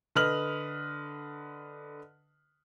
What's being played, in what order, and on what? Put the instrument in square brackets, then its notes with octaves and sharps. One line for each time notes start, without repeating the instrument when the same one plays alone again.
[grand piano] D3 B4 D#5 F6 F#7